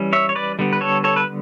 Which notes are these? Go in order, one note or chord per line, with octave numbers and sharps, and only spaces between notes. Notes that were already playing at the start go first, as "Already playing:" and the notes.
Already playing: E3 G3 C#4
C#5 E5
C#5
B4 D5
D3 G3 B3
B4
A4 C#5
A4 C#5
B4